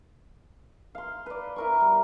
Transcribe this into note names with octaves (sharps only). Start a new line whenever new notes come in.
F5 C6
B4 D5
E4 A#4 C#6
G3